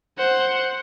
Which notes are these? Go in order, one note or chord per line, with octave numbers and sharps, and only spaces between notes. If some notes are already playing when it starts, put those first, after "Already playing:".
C5 F#5